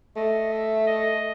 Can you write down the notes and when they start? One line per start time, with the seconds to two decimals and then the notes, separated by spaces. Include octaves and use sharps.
0.16 A3 D#5
0.52 E5
0.87 D#5